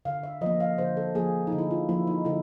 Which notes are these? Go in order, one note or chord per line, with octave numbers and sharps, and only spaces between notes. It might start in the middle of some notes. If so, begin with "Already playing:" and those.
D3 F5
E5
F3 A#3 D#5
F5
D3 C5
A4
F3 A#3 G#4
D#4
D3
E4
F4
F3 A#3 E4
D#4
D3 E4